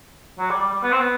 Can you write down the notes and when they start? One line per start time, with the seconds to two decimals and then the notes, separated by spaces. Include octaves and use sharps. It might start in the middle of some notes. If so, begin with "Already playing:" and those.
0.39 F#3
0.50 G3
0.61 G3
0.72 G3
0.83 B3
0.92 C4
1.00 B3